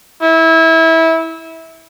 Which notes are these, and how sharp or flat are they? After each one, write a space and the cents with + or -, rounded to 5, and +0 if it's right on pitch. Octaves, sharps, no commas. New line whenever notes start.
E4 -20